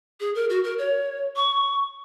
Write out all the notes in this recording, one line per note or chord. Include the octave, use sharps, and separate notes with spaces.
G#4
A#4
F#4
A#4
C#5
C#6